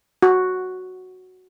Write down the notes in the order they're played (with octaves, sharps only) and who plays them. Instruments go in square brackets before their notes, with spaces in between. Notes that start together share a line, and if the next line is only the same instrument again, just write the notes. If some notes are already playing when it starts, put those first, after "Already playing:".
[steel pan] F#4